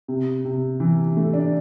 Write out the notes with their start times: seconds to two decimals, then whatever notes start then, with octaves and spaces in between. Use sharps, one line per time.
0.08 C3
0.45 C3
0.80 E3
1.17 A3
1.33 D4